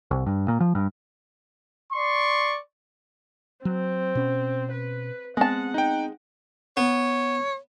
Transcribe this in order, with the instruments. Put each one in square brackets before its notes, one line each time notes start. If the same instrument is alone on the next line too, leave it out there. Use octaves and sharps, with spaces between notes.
[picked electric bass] C2
G2
A#2
F3
G2
[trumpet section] D5 C6 C#6
[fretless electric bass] F#3 [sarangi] C4
[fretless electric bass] B2 C#4
[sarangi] B4
[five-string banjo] G#3 A5 [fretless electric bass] B3 C4 [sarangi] F#5
[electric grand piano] D#4 G5
[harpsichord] B3 [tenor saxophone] C#5